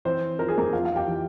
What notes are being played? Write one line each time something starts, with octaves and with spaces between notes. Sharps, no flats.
E3 C4 C5
F2 A#4
G#4
A#3 A#4
F2 F4 F5
F5
G4 G5
E3